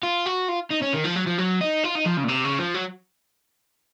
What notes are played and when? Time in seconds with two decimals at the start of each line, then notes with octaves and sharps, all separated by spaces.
0.03 F4
0.26 F#4
0.49 F4
0.71 D#4
0.82 C#4
0.94 D#3
1.05 F3
1.16 F#3
1.27 F3
1.38 F#3
1.61 D#4
1.84 F4
1.95 D#4
2.06 F3
2.17 C#3
2.24 A#2
2.28 C3
2.44 C#3
2.59 F3
2.74 F#3